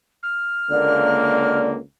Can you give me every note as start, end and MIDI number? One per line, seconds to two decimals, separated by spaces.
0.23 1.59 89
0.71 1.78 37
0.71 1.78 50
0.71 1.78 58
0.71 1.69 74